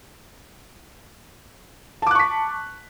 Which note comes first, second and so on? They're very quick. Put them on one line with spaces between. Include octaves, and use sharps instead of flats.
A5 D6 F#6 C#6 B6